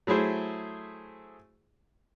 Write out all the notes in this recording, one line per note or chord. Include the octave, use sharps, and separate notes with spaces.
F#3 A3 E4 G#4 C5